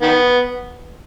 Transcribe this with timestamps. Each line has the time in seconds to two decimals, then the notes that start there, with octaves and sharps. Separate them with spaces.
0.02 D#3 B3